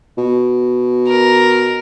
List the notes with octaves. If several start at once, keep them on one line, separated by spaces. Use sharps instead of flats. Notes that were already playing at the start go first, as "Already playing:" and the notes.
B2
A#4